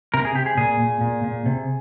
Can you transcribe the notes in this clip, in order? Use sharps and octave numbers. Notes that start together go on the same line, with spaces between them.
C3 A#4
G#4
C3 G4
G#4
A#2 G#4
A#2
A#2
A#2
C3